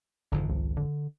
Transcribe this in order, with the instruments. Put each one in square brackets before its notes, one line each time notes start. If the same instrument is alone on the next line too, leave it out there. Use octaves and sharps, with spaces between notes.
[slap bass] G#1 F2 G#2 [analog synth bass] D3
[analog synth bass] C#2
D3